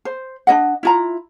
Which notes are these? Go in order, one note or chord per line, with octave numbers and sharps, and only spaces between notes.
C5
D4 D#4 D#5 F#5
E4 F4 A#5